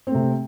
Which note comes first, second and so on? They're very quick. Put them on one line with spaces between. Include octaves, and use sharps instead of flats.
C4 A3 C3